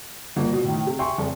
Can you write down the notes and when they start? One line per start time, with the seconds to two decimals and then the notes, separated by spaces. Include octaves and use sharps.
0.36 G1 F3 A#3
0.52 B2
0.64 A2 D#3
0.87 C3
0.99 E5 G5 G#5 C6 C#6
1.18 F1